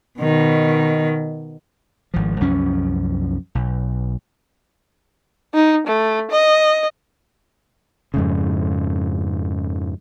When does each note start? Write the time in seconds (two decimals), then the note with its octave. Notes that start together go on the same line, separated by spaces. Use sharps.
0.20 B2 D#3
2.14 G#1 F3
2.40 C2 F#2 F3 C#4
3.55 B1
5.54 D#4
5.87 A3
6.31 D#5
8.14 F2 G#2 C#3